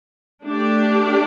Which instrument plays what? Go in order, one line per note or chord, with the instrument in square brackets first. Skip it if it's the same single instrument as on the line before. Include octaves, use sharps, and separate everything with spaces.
[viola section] A3 D4 G4 D5